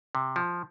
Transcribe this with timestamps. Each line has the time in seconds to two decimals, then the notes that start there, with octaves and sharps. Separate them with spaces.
0.15 C3
0.36 F3